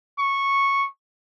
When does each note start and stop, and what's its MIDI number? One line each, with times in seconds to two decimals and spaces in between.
0.19 0.85 85